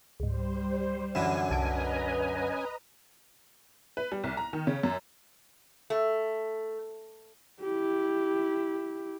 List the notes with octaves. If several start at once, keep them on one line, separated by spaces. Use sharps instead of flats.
C#2 G#2 G3 C5
F#2 D3 E3 C#4 G#5 B5 E7
C2 B4 D#5 A5 A#5 D7
B4
G3
C2
A#5
D#3
C#3
F#2
A3
E4 G4